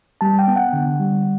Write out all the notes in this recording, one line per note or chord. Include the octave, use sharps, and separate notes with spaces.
G3 A5
G5
B3
F#5
D3
G3